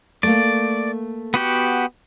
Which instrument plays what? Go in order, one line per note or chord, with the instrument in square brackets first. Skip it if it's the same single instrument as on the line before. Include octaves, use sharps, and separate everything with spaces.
[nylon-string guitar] A3 A#3 [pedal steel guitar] D5
[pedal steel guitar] B3 F#4 G4